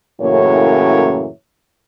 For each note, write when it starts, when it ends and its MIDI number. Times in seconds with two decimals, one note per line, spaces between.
0.21 1.28 42
0.21 1.28 45
0.21 1.28 49
0.21 1.28 52
0.21 1.28 58
0.21 1.28 73